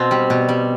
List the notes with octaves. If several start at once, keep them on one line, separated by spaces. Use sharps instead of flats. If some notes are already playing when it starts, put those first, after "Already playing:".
Already playing: B2 C4
G3
B2
G3